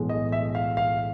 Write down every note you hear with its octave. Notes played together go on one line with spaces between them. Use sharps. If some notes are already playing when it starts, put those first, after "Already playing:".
Already playing: B1 A2 E3 G#3
D#5
E5
F5
F5